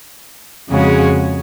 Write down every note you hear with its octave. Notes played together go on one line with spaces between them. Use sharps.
F2 C#3 G#3 C#4 F#4